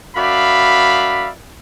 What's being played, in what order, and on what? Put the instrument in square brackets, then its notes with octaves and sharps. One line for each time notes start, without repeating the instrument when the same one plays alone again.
[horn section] F#2 D5 E5 F5 B5